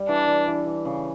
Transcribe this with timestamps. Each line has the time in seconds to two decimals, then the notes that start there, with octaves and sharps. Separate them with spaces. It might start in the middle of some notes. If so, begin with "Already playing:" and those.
Already playing: G3
0.09 E3 D4
0.28 E3
0.47 E3
0.66 E3
0.85 C#3